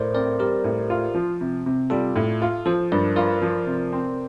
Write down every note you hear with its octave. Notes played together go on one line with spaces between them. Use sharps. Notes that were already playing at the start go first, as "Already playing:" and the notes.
Already playing: A2 A#4 C5 D5
C4 A#4 D5
G3 G4 A#4
A2
F4
F3
C3
C3
G3 F4 A4
A2
F4
F3 A4 C5
G2 A#4 D5
F4 A#4 D5
F3
C3
C4